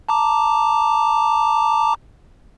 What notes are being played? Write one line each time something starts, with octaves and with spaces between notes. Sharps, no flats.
A5 A#5 D6